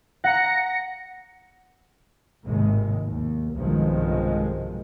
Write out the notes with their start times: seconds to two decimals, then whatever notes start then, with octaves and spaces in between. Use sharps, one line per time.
0.24 F#5 A#5 A#6 C#7
2.46 G#1 D#2 A2 C3 D#3 G#3
3.06 D#2
3.55 B1 G2 C3 D#3 F3 G#3